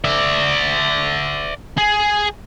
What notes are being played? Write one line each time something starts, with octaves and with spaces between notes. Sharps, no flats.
D5 E5
G#4